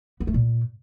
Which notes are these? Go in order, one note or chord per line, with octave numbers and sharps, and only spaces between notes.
B3
A3
A#2